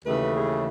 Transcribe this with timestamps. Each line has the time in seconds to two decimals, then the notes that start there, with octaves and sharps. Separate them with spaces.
0.05 D#2 C#3 E3 A3 B4
0.33 G#4